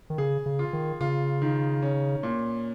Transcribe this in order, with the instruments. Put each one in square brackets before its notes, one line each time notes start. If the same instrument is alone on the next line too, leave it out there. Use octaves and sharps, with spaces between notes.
[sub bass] D#3
[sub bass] C#3 [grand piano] G#4
[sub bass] C#3
[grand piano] F4
[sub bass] D#3
[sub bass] C#3 [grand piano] F4
[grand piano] D#3
C#4
A#2